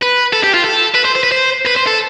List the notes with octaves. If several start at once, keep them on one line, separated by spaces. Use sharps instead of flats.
B4
A4
G4
F4
A4
B4
C5
C5
B4
C5
B4
C5
A4